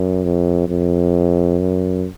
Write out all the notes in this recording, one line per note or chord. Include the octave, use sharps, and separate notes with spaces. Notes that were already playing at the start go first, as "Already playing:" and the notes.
Already playing: F#2
F2
F2
F#2